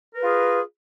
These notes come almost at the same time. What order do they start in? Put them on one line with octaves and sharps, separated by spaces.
A#4 B4 G#4 F4